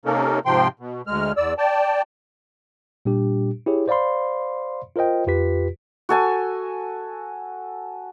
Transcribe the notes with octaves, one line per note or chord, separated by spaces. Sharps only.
C3 A#3 C#4 D#4 A4 A#4
G#2 C3 F3 G5 C6
B2
D2 G#3 F6
E2 D5 E6
D5 G5 A5
A#2 G3 D4 G4
E4 G4 G#4 C#5
C5 D5 F5 B5 C6
F4 A#4 C5 D#5 G5
F2 F4 G4 B4 B6
F#4 A4 G#5